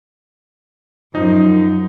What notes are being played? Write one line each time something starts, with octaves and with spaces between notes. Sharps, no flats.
F#2 F3 D#4